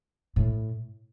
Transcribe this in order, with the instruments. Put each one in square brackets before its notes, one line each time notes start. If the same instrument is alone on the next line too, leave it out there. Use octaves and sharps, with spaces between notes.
[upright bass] A2